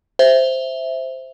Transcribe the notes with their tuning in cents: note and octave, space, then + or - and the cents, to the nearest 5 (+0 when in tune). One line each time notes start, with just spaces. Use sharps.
C5 +0 E5 +0